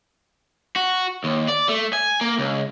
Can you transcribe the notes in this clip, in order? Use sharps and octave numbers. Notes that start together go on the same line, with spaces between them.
F#4
D#2
D5
A3
G#5
A#3
C#2